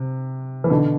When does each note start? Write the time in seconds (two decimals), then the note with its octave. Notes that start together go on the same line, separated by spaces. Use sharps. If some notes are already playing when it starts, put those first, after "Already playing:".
Already playing: C3
0.64 E3
0.70 B2 D3